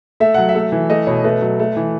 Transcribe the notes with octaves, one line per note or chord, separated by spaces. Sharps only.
A3 E5
F#3 F#5
E5
A3
E3
A3 D#5
B2 C#5
A3 B4
F#3
A3
E3